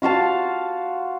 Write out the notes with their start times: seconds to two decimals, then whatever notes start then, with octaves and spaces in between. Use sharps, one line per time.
0.02 F4 F#4 F5 A5